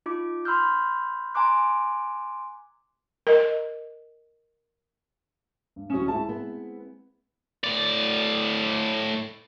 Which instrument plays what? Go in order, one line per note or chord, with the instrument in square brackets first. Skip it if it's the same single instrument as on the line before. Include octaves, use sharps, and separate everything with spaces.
[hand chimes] D#4 F4 D6
B5 C6 E6 F6 G6
G#5 A#5 C6 D6 F#6
[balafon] A#4 D#5
[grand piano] G2
[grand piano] D1 D#6 E7 [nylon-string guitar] C#4 F#4
[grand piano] G#3 C4 E4 [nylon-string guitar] A5
[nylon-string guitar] B3
[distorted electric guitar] A2 D5